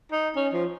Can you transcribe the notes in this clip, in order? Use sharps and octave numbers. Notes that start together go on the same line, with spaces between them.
D#4
C#4
F3